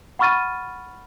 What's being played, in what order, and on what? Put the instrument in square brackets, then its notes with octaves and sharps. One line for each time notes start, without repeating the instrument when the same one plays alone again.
[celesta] F#5 B5 C#6 F6 A6 D#7